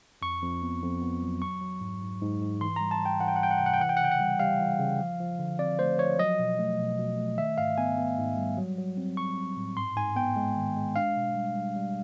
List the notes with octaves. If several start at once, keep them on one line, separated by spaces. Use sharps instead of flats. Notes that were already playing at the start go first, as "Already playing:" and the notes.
F2 C#6
F2
B3
F2
B3
F#3
F#3 C#6
F#3
G#2
G#2
G#2
G#2
E3 C6
G3 A#5
A5
G3
G5
E3 F#5
G5
F#5
G3 G5
F#5
C3 G5
F#5
G5
E3 F#5
G5
F#5
C#3 G5
F#5
G3
G3 F5
E3
C#3
F3
F3
D3
C4 D5
A3 C5
F3 C#5
F#3 D#5
B2
A3
B2
B2
A3
D#3 E5
G#2 F5
B3 G#5
B3
G#2
G3
F#3
F#3
C4
F#3 C#6
C4
A2
G#2 C6
G#2 G#5
B3 G5
G#3
D#3
G#3
D4 F5
B2
G3
G3
G3